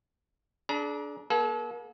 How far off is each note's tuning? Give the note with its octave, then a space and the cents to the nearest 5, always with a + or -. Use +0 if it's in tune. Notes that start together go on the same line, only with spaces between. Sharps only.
D4 -10 G#4 +40 A#5 +35
A#3 +40 A4 -35